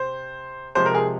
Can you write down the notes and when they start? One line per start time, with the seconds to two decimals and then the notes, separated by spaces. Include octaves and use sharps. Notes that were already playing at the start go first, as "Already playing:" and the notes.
Already playing: C3 C5
0.75 C3 F3 G#3 C5
0.86 A#4
0.95 G#4